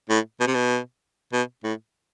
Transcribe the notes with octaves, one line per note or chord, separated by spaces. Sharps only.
A2
B2
C3
B2
B2
A2